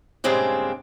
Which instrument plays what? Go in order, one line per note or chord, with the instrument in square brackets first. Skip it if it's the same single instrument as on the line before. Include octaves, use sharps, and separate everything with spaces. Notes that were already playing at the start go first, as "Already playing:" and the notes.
[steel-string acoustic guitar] G2 A#2 C#3 G#3 C4 D4